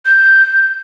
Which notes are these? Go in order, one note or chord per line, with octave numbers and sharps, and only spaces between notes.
G6